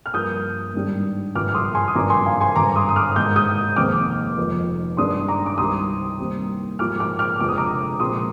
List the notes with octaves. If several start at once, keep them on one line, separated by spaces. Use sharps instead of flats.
F6
G2 F3 A#3 D#6 G6
G#2 D#3 G3 D4
G#1 G2 F3 D6 F6
F6
C6 D#6
G#5 C6
D#6
G#1 G2 F3 A#3 D4 A#5 D6
G#5 C6
F5 G#5
G#5 C6
G#1 G2 D3 A#5 D6
C6 D#6
D#6
D6 F6
G#2 D#3 A#3 G6
D#6 G6
F1 D#2 D#3 G#3 C4 D6 F6
F1 F2 D#3
G2 D#3 G#3 D4 C6 D#6
A#5 D6
D6
C2 C3 D#3 G3 C6 D#6
D#2 D#3 G3 C4
G#2 F3 A#3 D6 F6
D6 F6
D6 F6
F1 F2 D3 G#3 C4 D6
D#6
A#5 D6
A#1 A#2 G#3 C4 C6 D#6